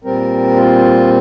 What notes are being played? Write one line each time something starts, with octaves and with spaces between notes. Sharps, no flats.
A#2 G3 C4 A#4
F4